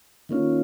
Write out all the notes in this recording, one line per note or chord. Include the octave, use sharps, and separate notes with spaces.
D#3 A#3 C#4 F4